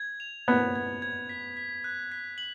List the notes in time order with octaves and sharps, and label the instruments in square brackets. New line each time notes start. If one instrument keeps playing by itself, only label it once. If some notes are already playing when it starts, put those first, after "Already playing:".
Already playing: [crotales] G#6
F7
[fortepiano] B3 [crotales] G#6
[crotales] G#6
G#6
B6
B6
F#6
B6
F#7